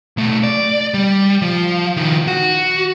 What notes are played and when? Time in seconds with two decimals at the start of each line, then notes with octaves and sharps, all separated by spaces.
0.17 B1 A3
0.43 D5
0.94 G3
1.42 F3
1.97 D#3 F3
2.28 F#4